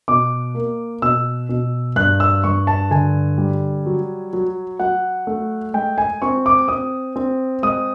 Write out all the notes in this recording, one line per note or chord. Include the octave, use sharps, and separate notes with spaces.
B2 D6
A#3
B2 E6
B2
G2 F#6
E6
G2 C#6
A5
D3 G#5
G3
F#3
F#3
F#3 F#5
A3
G#3 G5
G#5
C4 C#6
D6
C4 D#6
C4
G#3 D#6